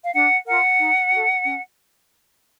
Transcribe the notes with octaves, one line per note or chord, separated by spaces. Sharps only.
F5
D4 F#5
F4 A#4 F#5
D#4
F#4 A4
C#4